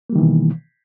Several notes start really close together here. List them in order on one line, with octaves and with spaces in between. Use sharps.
A#3 G3 D#3 E3 B2